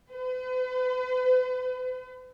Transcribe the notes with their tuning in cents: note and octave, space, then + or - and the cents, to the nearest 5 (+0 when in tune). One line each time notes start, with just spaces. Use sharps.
B4 +45